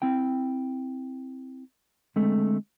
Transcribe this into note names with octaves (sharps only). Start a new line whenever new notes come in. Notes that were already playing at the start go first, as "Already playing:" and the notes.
C4 E4 G5
D3 G#3 A3 C4